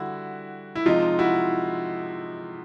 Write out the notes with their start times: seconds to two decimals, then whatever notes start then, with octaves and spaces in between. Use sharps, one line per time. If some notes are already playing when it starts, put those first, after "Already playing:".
Already playing: D3 G3 E4 F#4
0.75 E4
0.86 C3 F3 G#3 D#4 F4
1.19 E4 F#4